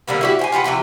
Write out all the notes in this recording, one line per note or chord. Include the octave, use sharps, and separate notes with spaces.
D3 G3 A#3 B3
E4 F#4 G4
C5 G5 G#5
F4 G4 B4 F#5
C3 E3 F3 F#4